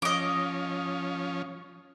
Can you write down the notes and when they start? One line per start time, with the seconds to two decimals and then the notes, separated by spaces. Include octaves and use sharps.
0.02 F3 C#4 D#5 D6